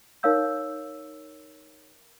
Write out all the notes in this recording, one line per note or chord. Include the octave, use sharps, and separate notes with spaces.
D#4 A#4 C#5 F5 E6 G6